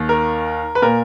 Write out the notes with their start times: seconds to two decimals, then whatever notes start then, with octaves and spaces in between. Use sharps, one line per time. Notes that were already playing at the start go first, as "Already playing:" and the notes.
Already playing: D#2 D#3
0.09 A#4
0.75 B4
0.82 A#2 A#4